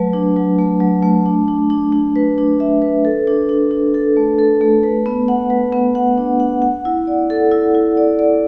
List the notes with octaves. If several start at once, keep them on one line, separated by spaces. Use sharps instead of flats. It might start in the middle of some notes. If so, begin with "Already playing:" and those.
Already playing: F#3 A3 B4
D4
F#3
A3
F#3
A3
D4
D4
D4
D4
B4
D4
E5
B4
A4
D4
D4
D4
A4
A3
A4
A3
B4
B3
F#5
B4
B3
F#5
D4
F#5
F#5
E4
D5
A4
E4
E4
D5
D5